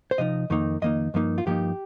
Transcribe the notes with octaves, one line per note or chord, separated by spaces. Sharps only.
C5
C3 F3 D#4 D#5
F2 D#3 A#3 D#4
F2 D#3 A#3 D#4 D#5
G2 F3 A#3 D#4
F4
G2 F3 A#3 D#4 G4